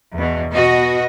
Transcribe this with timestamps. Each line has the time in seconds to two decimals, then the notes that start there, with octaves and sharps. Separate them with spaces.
0.17 E2 B2
0.51 B2 F#4 D#5